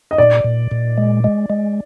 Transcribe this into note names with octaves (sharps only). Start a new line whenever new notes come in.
D#5
A#2 D5
A#2
A#2
G#3
G#3
G#3